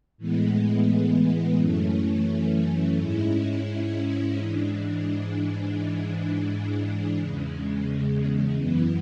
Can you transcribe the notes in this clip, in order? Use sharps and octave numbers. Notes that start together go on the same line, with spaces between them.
A2 E3 G#3 B3
F#2 E3 A3 C#4
G#2 G#3 C#4 E4
G#2 E3 G#3 D4
G#2 E3 G#3 D4
E2 C#3 G#3
F#2 E3 B3